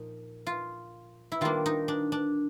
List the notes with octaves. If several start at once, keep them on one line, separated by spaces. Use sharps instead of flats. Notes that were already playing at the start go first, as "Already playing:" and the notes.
Already playing: A#2 F3 D#4
F4
E4
D#3 G3 A#3 D4 F4
D#4
D4
D4